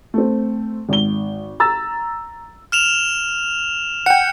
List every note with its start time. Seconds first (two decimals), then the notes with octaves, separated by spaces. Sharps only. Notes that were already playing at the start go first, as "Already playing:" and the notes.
0.14 A3 C4
0.89 G#1 G7
1.60 A#5 E6 A6
2.72 F6 E7 F7
4.06 F#5 G5 C#7